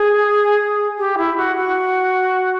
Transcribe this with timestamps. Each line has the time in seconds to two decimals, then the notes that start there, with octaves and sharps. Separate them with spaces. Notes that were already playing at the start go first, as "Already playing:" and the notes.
Already playing: G#4
0.98 G4
1.17 E4
1.36 F#4
1.56 F#4